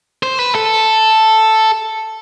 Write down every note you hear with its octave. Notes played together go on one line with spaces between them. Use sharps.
C5
B4
A4